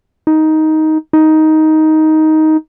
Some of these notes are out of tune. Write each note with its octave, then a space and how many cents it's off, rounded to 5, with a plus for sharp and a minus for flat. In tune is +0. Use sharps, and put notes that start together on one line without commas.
D#4 +10
D#4 +10